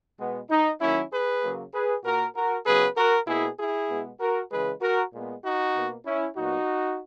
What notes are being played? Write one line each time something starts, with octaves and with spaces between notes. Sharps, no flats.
B2 G#3 B3
D#4
D#3 F#3 A#3 C#4 E4
G#4 B4
C#3 F#3 A#3
G#4 B4
A#2 A#3 F#4 A#4
F#4 A#4
C#3 F#3 B3 G#4 B4
F#4 A#4
B2 A#3 E4 G#4
E4 G#4
B2 G#3 B3
F#4 A#4
C#3 E3 G#3 G#4 B4
F#4 A#4
A#2 G#3 B3
D#4 F#4
B2 A#3
C#4 E4
A#2 F#3 B3 D#4 F#4